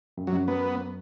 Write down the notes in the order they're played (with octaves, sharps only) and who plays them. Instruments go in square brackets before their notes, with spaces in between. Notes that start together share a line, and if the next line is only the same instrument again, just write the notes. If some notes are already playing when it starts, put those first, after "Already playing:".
[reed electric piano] F#2
[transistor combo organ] F#3
[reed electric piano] F#2
[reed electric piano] F#3 [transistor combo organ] B3